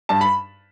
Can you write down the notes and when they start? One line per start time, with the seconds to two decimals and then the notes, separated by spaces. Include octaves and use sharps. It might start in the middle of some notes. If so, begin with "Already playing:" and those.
0.09 G2 A5
0.21 B5